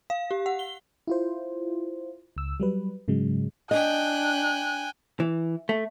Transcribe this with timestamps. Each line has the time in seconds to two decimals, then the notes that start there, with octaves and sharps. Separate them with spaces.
0.10 F5
0.31 G4
0.46 F#5
0.59 G7
1.07 E4 F4 C5
2.37 C#2 E6
2.60 F#3 G3 B4
3.08 G#2 C#3 F#3 G#3
3.71 D4 D#5 G5 G#5 F#6
5.20 E3
5.69 A3